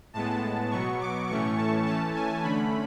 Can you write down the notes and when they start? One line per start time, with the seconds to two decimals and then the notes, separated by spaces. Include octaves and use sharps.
0.13 A2 G#3 B3 A5
0.71 B2 F#3 B3 C#6
1.01 D6
1.29 A2 E3 A3 C#4 C#6
1.57 A5
1.85 E3 A3 C#4 A5
2.14 G#5
2.43 D3 A3 C#4 B5